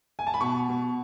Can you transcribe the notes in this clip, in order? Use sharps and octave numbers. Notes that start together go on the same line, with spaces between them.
G#5
A5
B5
B2 C#6
B2